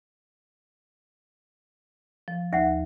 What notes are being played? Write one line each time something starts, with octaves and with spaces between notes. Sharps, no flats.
F3
D#2 E5 F#5